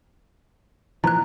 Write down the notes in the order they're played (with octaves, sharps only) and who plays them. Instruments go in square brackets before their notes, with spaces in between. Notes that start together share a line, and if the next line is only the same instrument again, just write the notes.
[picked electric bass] A#2 E3 F3 [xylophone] A#5 F#6